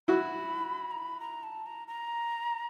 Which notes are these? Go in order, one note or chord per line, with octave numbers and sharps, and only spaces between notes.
E4 F#4 B5
A#5
B5
A#5
A5
A#5
A#5